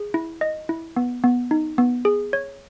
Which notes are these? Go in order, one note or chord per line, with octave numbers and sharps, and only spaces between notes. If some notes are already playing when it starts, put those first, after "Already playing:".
Already playing: G#4
E4
D#5
E4
B3
B3
D#4
B3
G#4
C#5